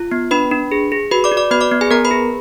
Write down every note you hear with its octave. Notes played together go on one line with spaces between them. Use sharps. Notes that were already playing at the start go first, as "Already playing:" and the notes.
Already playing: F4
B3
D4 B4 B5
D4
G#4
G#4
F#4 B4 B5
D5 D6
F#4
D5 D6
B3 B4 B5
D5 D6
B3
G#4 G#5
B3 A#4 A#5
B4 B5
G#4